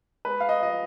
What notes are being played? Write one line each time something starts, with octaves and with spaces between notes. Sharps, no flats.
G#3 B4
F5
D#5
F3 D#5